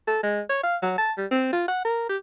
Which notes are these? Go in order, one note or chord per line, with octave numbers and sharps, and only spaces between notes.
A4
G#3
C#5
F5
F#3
A5
G3
C4
F4
F#5
A#4
G4